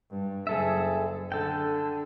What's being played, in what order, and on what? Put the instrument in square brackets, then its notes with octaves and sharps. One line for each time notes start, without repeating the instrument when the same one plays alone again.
[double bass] G2
[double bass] F#1 [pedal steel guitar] G#4 A4 E5
[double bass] D3 [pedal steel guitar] A4 G5